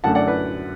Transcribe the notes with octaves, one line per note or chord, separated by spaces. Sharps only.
F#2 D3 A3 F#5 A5
D5 F#5
B4 D5